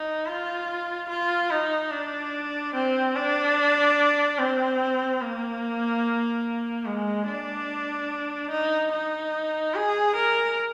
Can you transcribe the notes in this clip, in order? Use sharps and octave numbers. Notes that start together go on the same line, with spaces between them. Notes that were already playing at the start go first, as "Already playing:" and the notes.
Already playing: D#4
F4
F4
D#4
D4
C4
D4
C4
A#3
G#3
D4
D#4
D#4
G#4
A#4